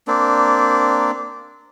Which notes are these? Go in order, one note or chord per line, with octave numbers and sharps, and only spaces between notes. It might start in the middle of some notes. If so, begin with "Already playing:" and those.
A#3 C4 D4